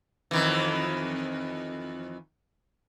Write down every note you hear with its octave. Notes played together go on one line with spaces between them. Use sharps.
F2 D#3 E3